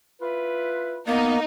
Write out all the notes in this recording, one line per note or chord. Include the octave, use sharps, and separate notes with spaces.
E4 F4 B4
A#3 B3 D#4